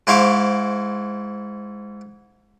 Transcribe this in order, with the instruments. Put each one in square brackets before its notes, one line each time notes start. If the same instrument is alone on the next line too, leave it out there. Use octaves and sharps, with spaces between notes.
[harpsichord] G#2 E4 C5 F5 C#6 D6